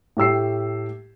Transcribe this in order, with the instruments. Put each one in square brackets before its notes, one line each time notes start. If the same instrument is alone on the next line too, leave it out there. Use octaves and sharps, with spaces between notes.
[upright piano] A2 G4 E6 C7